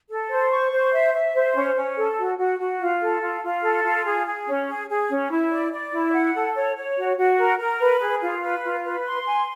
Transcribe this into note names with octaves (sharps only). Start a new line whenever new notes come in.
A4
C5
C#6
C5
E5
E5
C5
C#4
C#4
A4
F#4
F#4
F#4
F4
A4
F4
F4
A4
F4
G#4
G#4
C#4
G#4
G#4
C#4
E4
D5
D5
E4
F#5
A4
C#5
C#5
F#4
F#4
A#4
A#4
B4
G#4
F4
B4
F4
B4
C6
G#5